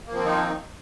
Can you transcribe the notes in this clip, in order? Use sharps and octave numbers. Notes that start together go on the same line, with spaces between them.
D#3 F3 A#3 C4 D#4